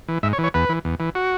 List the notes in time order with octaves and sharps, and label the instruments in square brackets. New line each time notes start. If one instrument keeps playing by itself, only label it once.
[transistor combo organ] E3
G#2 E5
C#5
E3
C#5
E2 B4
E3
E2
E3
F#4